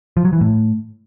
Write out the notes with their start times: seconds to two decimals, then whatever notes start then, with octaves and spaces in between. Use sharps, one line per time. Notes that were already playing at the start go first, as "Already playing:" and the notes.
0.17 F3
0.25 F#3
0.33 E3
0.41 A2